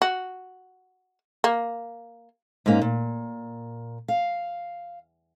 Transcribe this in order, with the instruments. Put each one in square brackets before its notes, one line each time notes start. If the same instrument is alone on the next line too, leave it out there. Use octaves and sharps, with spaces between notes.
[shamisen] F#4
A#3
[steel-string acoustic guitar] G#2 G#3 A#3 C#4
A#2
F5